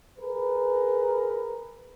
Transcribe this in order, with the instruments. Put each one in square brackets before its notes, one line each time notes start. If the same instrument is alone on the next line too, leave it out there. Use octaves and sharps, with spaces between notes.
[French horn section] G#4 A#4 B4